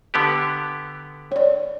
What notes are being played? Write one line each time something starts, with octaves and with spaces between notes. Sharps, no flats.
D3 B3 G4
C#5 D5